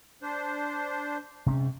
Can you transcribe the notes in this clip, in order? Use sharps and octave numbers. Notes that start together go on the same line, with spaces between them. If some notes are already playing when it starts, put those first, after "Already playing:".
D4 C5
G#2 C3 C4 C#4